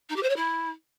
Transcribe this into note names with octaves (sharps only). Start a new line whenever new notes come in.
D#4
G4
C5
C#5
E4